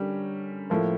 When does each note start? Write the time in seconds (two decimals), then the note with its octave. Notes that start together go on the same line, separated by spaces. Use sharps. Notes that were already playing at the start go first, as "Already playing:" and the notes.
Already playing: D3 G3 C#4 G4 A#4
0.70 A2 F3 A#3